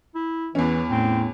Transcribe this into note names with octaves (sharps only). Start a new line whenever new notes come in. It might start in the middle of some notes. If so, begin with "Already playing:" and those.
E4
E2 E3 C#4
A2 C4